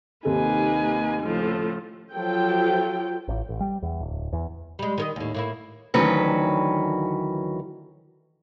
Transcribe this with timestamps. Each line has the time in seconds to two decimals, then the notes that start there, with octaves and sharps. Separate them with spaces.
0.25 D#2 C3 A#3 D#4 A4 B4 G#5
1.21 A2 C#3 F3
2.13 F3 F#3 F4 A4 G5
3.28 A1
3.49 A1
3.60 G3
3.83 E2
4.01 D1
4.33 E2
4.79 G3 G#3
4.98 D#3 A#4 D#5
5.16 D#2 A2
5.35 A2 A#3 E4
5.94 D2 D#3 E3 F#3 C#4 B4